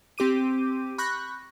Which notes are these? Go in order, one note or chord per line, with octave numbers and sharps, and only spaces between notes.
C4 G4 D6 D#7
B5 C#6 F#6 G6 A#6